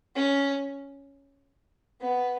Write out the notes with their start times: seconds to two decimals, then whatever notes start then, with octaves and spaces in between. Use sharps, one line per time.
0.15 C#4
2.01 B3